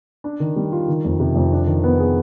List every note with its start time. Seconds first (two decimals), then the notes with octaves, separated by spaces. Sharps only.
0.24 D4
0.40 D#3
0.56 G3
0.72 F4
0.88 D#3
1.05 F2
1.20 C3
1.36 F2
1.52 D4
1.67 D#3
1.84 B3
1.99 G#4